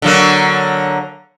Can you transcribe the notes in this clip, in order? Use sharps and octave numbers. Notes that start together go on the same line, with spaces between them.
D3 F#3 A#3